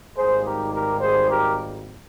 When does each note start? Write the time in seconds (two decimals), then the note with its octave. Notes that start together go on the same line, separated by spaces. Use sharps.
0.17 G#1 G#2 D#3 G3 A#3 G#4 C5
0.45 G4 A#4
0.73 G4 A#4
1.01 G#4 C5
1.29 G4 A#4